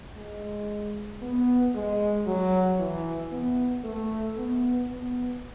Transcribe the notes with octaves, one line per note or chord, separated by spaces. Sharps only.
G#3
B3
G#3
F#3
E3
B3
A3
B3
B3